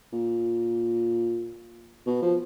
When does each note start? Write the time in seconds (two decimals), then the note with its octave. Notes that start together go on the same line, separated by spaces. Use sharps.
0.13 A#2
2.06 B2
2.22 F3